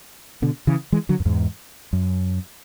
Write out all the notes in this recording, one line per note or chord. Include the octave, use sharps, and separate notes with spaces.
B2 D3
C#3 E3
E3 G#3
D3 F#3
F#2
E2 G#2
F#2